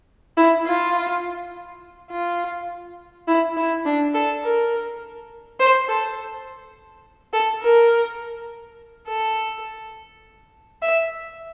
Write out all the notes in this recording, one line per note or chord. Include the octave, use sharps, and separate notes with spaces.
E4
F4
F4
E4
E4
D4
A4
A#4
C5
A4
A4
A#4
A4
E5